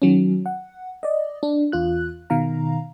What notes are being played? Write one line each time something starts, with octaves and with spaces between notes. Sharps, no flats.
D#3 F#3 C#4
F#5
D5 D#5
D4
E2 F4 F#6
B2 D#3 F5 A#5